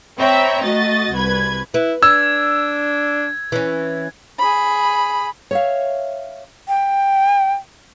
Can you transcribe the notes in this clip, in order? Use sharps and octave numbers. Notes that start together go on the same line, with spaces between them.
C4 C#5 E5 G5 A#5 B5
A3 F#4 D#5 A6
C2 B4 G#6
E4 B4
D4 E6 G#6
E3 C#4
G#4 B5
C#5 E5 F5
G5